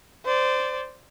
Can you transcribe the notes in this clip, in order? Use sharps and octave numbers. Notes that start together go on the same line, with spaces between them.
C5 D5